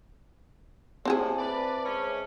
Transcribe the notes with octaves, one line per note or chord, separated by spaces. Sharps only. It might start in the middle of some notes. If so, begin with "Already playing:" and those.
A2 C4 E4 G#4 C5 E5 A5
B4 D5
G#3 C#4